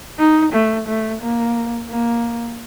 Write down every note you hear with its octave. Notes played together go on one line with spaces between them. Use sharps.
D#4
A3
A3
A#3
A#3